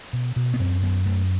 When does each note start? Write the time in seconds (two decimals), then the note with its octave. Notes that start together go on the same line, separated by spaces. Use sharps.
0.13 B2
0.36 B2
0.54 B3
0.60 F#2 C4
0.82 F#2 B3
1.05 F#2 A3